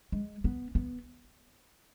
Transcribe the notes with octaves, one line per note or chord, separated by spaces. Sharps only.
G#3
B3
B3